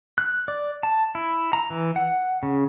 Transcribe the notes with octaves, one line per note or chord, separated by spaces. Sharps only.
F#6
D5
A5
E4
A#5
E3
F#5
C#3